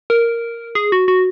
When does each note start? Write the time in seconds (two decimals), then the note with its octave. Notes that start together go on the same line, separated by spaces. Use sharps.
0.10 A#4
0.75 G#4
0.92 F#4
1.08 F#4